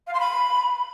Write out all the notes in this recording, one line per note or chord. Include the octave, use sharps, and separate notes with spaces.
F5
C6
B5